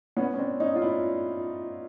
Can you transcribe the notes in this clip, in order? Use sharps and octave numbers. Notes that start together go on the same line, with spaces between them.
B3 C#4
C#4
C4 D4
C#4 D#4
F4
D4 E4